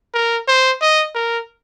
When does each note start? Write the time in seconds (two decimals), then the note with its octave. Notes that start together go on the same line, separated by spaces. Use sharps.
0.14 A#4
0.48 C5
0.82 D#5
1.15 A#4